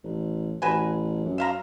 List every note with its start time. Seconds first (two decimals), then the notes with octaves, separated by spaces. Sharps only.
0.04 A1
0.62 A1 F#4 B4 G#5
1.24 F#2
1.38 E5 F5 A#5